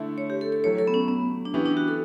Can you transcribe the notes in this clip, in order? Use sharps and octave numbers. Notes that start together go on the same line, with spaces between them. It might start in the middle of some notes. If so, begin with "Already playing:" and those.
Already playing: D3 A3 E4
C#5
G4
A4
A4
F#3 A3 E4 G4 C#5
A4
B3
C#4
B3
D4
E3 B3 C#4 E4 G4
D4
F#4
A4